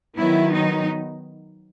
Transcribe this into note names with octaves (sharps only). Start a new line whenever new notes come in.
D#3 F#3 B3 E4
D#4